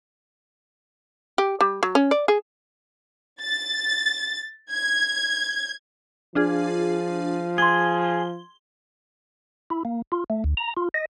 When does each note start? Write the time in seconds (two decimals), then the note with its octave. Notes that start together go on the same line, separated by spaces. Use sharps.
1.38 G4
1.61 G3
1.83 F#3
1.95 C#4
2.11 D5
2.28 G#4
3.42 A6
4.74 G#6
6.35 F3 D4 F4 G#4
7.58 G#4 C6 G#6 G7
9.70 E4
9.85 A#3
10.12 F4
10.30 A3
10.44 D2
10.57 A#5
10.77 F4
10.94 D#5